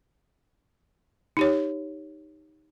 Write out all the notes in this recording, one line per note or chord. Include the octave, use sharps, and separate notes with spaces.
D#4 G4 C#5